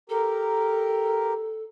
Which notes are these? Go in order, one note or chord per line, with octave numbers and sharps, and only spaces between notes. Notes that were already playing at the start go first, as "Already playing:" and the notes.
G4 A4 A#4